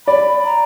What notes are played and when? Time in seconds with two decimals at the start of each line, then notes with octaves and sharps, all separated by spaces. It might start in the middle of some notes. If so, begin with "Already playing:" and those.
0.07 D5 B5
0.44 A#5